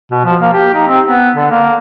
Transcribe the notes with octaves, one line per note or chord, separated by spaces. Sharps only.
B2
F3
A#3
G4
D#4
C4
B3
D3
A#3